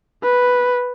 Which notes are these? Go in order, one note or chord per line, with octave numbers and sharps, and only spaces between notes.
B4